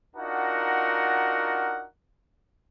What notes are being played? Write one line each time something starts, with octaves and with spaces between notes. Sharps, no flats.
D4 D#4 F4 F#4 A#4 F#5